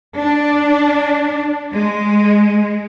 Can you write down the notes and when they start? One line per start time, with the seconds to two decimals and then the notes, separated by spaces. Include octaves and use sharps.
0.17 D4
1.73 G#3